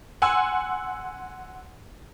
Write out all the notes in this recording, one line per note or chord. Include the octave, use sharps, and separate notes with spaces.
F#5 G#5 C6 E6